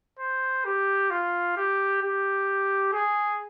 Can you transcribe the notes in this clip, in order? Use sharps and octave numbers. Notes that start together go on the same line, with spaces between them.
C5
G4
F4
G4
G4
G#4